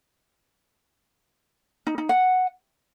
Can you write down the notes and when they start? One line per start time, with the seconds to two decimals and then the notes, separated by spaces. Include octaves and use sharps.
1.87 D#4
1.98 D#4
2.09 F#5